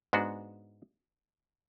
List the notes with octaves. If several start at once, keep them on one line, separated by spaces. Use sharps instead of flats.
G#2 G#3 B3 D4 F#4